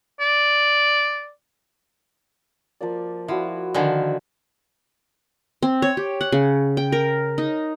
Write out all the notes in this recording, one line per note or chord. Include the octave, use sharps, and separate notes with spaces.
D5
F3 A#3 D5
F3 E4 F#4 D5
D3 D#3 F3 F#5 G#5 B5
C4
C#5
G4
F#5
C#3
G5
A#4
D#4